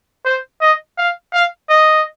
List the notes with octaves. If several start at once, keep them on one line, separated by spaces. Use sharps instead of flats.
C5
D#5
F5
F5
D#5